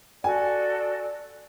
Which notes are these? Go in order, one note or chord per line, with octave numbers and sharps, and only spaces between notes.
F#4 A4 D5 G#5